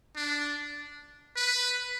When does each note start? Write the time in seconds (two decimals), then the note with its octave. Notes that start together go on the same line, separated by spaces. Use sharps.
0.16 D4
1.36 B4